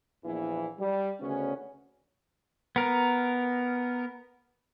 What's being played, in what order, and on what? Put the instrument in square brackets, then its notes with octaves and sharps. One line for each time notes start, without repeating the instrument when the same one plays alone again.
[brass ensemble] A#1 E2 E3
G3
D2 C#3 B3 C#4
[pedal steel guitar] B3 A#4